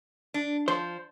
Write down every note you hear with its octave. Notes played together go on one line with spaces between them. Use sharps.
D4
F3 C5